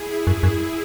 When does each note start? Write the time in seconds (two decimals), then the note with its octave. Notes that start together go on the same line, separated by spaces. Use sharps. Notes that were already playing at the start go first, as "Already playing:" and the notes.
Already playing: E4 G#4
0.27 F#2
0.43 F#2